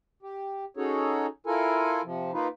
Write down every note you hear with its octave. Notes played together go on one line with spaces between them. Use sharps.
G4
C#4 D#4 F#4 G#4 A4 C#5
E4 F4 A4 A#4 G#5
C3 F3
A#3 D#4 F4 B4